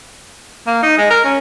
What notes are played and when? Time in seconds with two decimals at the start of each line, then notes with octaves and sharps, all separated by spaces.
0.67 A#3
0.83 D#4
0.98 G#3
1.10 A#4
1.24 C#4